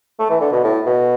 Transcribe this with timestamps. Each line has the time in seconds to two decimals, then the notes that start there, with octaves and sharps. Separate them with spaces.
0.19 A3
0.30 E3
0.41 D3
0.52 B2
0.64 A2
0.86 B2